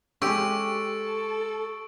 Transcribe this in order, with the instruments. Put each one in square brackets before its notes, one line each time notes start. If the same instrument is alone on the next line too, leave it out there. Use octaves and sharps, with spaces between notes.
[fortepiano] G#3 C#4 [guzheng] G4 [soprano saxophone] A4 [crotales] C#6 E6 D7